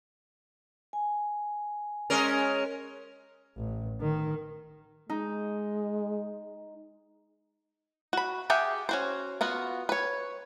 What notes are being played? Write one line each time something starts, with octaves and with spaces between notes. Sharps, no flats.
G#5
G#3 C#4 A#4
A1
D#3
G#3 D#4
F#4 B5
G4 G#4 E5 F#5 G5
C#4 F#4 C5
B3 F4 F#4
B4 C#5